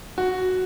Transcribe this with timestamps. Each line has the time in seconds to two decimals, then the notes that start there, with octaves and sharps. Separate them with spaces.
0.18 F#4